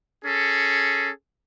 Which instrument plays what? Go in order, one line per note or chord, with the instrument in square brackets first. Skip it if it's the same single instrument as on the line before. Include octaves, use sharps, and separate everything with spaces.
[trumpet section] C#4 G#4 A4